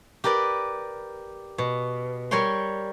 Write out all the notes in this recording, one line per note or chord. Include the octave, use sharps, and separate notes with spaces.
G4 A#4 B4 D5
B2
G3 A#4 C#5 G5 C6